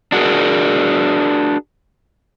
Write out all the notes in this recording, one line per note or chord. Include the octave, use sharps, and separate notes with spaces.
D4 F#4 G#4 A#4